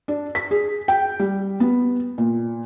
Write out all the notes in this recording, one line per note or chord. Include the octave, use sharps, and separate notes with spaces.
D4
B6
G#4
G5
G3
B3
A#2